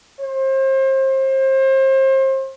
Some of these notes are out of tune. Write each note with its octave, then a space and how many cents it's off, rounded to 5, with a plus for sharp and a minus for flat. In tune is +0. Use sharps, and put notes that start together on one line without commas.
C5 +35